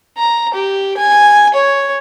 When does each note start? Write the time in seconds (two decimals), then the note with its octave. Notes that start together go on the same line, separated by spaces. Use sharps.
0.18 A#5
0.54 G4
0.97 G#5
1.54 C#5